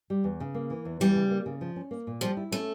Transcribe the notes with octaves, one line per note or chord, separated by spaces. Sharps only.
G3
E2
C#3
A#3
E3
E2
E3 G3
C#3
A#3
C#3
F3
C#4
A#3
A#2
F3 G3
E4
A3 C#4